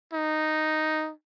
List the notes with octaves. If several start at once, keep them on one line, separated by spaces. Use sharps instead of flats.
D#4